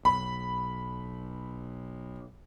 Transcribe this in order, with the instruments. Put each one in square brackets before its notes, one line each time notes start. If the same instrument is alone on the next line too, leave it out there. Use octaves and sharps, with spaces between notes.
[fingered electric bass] B1 [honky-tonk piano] B5